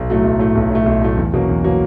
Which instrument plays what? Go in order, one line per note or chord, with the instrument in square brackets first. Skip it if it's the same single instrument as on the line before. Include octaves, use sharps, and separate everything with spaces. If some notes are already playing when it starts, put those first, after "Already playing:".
Already playing: [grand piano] B1
A2 F#3 A3
B1
A2 F#3 A3
B1
A2 F#3 A3
B1
A2 F#3 A3
E2
B2 F#3 A#3 C#4
E2
B2 F#3 A#3 C#4